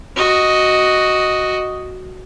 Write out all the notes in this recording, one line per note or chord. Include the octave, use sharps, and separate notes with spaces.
F#4 D#5